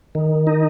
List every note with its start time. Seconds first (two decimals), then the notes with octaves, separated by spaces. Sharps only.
0.15 D#3
0.47 D#4